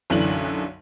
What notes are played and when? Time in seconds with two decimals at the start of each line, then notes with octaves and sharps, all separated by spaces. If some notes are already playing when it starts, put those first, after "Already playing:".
0.10 B1 F#2 D3 E3 D4 F#7